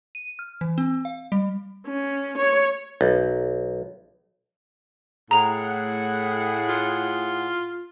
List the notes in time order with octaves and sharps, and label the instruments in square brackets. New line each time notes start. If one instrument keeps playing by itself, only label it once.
[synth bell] D#7
F6
E3
C4
F5
G3
[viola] C#4
C#5
[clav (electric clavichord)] B1
[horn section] A2 G#4 F#5 [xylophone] A#5 F7
[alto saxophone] F4